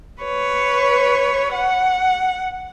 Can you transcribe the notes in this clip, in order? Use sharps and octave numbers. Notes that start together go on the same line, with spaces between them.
B4 C#5
F#5